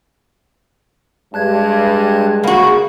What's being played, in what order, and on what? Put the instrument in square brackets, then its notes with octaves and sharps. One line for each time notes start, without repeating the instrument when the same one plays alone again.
[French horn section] G2 [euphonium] G#3 [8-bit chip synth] A5 F#6 G#6
[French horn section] C#3 [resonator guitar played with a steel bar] A#3 F#4 [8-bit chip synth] F#5 B5